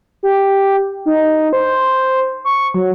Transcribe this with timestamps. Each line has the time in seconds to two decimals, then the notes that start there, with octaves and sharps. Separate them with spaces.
0.23 G4
1.06 D#4
1.53 C5
2.45 C#6
2.74 F#3